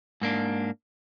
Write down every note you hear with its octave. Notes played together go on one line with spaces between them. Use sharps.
G#2 A#3 D4